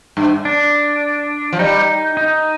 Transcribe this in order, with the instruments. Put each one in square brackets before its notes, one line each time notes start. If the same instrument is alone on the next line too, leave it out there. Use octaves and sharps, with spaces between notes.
[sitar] G2
[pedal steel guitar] D4
[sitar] F3
[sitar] G3 [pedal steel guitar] D#4
[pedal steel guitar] D#4